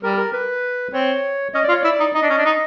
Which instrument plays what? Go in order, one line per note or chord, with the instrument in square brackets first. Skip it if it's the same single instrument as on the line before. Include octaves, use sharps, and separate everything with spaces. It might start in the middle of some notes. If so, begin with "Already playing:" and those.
[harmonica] G3 [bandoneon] A#4
[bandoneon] A#4
B4
[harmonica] C4 [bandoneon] C#5
[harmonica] C#4 [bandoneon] D#5
[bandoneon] D5
[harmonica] F4
[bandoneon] C#5
[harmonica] E4 [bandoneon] D5
[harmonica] D#4
[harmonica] D#4 [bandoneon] D#5
[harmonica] D4
C#4
D4
D#4